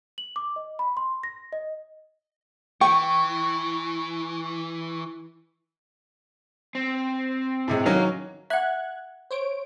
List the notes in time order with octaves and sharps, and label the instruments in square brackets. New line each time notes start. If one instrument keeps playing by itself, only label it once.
[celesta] F#7
D6
D#5
B5
C6
A#6
D#5
[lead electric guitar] E3 [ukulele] G5 [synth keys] C#6
[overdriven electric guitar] C4
[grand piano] A2 C3 G#3
[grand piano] D#3 F#3 C#4 [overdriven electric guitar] F5 A#5
[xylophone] E5 F#5 [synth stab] F#6 G#6
[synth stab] C5 C#5 D7